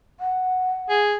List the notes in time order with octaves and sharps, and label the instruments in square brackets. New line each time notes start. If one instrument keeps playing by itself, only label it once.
[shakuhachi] F#5
[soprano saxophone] G#4